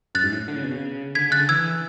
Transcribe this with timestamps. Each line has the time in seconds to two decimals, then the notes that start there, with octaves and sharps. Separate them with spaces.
0.15 F#2 F#6 A6
0.23 G#2
0.32 A2
0.48 D3
0.56 C#3
0.64 B2
0.71 C#3
1.15 D3 G#6 B6
1.30 C#3 F#6 A6
1.39 D3
1.49 E3 E6 G#6